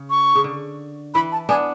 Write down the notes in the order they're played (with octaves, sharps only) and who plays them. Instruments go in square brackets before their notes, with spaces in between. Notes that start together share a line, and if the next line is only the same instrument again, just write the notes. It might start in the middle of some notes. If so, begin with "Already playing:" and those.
Already playing: [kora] C#3
[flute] C#6
[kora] C#3
D3
[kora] E3 [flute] B5
[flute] A5
[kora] B3 D4 [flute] G#5